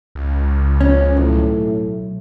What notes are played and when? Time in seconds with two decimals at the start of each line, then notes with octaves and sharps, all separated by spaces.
0.15 C#2
0.81 F3 C#4
1.17 B1 A2